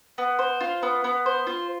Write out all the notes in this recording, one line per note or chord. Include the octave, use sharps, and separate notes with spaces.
B3
C5
F4
B3
B3
C5
F4